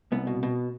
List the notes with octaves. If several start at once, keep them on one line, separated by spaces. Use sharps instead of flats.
C2 B3
B2
B2